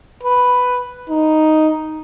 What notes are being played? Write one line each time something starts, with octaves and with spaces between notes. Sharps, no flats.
B4
D#4